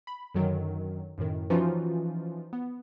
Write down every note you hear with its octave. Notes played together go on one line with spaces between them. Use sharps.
B5
F#2 D3 D#3 F#3
F#2 A2 D#3
E3 F3 C#4 D#4 F4 F#4
B3